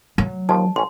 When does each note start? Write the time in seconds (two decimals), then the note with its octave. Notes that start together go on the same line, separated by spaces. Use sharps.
0.18 F#3
0.49 D#2 F3 A5
0.76 A1 C#4 C6